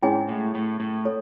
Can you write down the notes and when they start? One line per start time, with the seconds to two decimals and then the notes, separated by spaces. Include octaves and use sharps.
0.02 G#2 C#4 E4 G#4 C#5 G#5
0.29 A2
0.55 A2
0.80 A2
1.05 A4 C#5